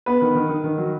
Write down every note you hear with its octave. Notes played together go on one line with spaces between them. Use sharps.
B3 B4
D#3
D#3
D#3
D#3
F#3